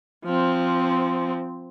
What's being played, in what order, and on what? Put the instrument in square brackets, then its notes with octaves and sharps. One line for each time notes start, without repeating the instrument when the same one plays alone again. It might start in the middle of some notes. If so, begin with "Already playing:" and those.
[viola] F3 C4